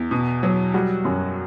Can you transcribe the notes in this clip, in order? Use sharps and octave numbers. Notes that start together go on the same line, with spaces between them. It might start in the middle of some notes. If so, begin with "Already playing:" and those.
Already playing: E2
B2
F#3
G3 F#4
F#2